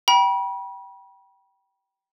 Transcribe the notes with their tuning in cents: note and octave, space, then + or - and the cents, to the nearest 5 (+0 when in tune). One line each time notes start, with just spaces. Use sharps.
G5 -10 B5 -35